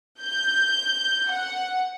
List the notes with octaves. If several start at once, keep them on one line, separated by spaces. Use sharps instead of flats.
G6
F#5